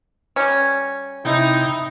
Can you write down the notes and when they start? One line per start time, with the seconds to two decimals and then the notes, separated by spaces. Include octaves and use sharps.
0.36 G3 C#4
1.25 C3 D#4 E4 G5